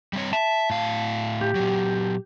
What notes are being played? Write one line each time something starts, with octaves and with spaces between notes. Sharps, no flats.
G3 C4 C#5
E5 A5
A2 F5
G4
A#2 F#3